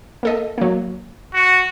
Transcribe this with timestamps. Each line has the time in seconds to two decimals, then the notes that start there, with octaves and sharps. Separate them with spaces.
0.23 A#3 A4 D#5
0.58 F#3 A#3
1.34 F#4